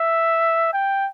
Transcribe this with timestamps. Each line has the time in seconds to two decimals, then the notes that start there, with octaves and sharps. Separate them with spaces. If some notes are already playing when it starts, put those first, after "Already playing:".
Already playing: E5
0.73 G5